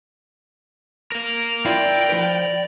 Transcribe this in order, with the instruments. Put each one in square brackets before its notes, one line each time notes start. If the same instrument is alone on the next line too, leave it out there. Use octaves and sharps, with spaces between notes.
[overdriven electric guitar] A#4 F5
[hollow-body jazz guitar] E4 F4 [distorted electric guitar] D5 [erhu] G5
[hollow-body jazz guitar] F3 B4